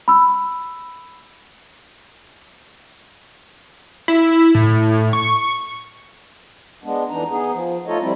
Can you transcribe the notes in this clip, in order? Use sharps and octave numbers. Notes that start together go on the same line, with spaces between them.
B5 E6
E4
A2
C#6
G#3 B3 D4
F2 E3 D4 D#4 A#5
B3 D#4 G#4
F3
A3 D#4 F4 A4 C#5 D#5
F3 G3 C4 E4